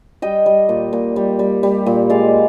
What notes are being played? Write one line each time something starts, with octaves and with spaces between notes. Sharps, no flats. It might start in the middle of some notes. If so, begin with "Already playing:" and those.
G3 D#5 G5
G3
A#2
A#2
G3
G3
G3
A#2
G#3 D5 F5